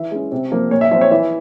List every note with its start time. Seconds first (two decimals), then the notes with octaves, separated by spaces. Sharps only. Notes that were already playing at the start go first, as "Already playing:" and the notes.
Already playing: E3 E5
0.11 G#3 C#4
0.32 C3
0.52 F3 A#3
0.71 A#2 C#5
0.81 E5
0.91 F3 C4 E5
1.01 C#5
1.11 E3 E5